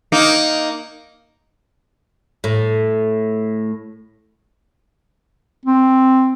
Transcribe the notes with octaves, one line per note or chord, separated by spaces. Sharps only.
A#3 D#4
A2
C4